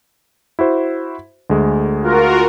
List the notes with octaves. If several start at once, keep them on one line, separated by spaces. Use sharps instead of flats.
E4 F#4 C5
D2 G#3 A3
F4 F#4 A#4